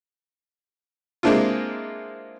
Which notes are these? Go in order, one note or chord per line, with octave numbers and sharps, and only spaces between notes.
G#3 A#3 C4 D4 E4 F4